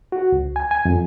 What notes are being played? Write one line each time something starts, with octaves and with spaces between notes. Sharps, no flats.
F#4
C#2
G#5
G#5
F2